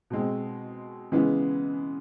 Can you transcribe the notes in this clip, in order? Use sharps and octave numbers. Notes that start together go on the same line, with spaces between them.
B2 G#3 C4
C#3 E3 G#3 B3